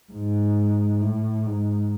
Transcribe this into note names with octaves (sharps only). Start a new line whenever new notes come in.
G#2
A2
G#2